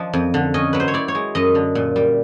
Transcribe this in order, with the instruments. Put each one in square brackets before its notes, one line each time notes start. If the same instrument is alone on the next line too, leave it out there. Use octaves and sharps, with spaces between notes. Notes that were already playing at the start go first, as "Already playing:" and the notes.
Already playing: [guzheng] F3 D4 D#5
F2
D3
C#4 D#5
F#3 B4
C5
C#5
E4 D5
C#5
G#3
F#2 D#5
D3
A#2
G3